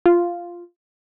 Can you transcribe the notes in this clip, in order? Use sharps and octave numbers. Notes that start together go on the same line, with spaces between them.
F4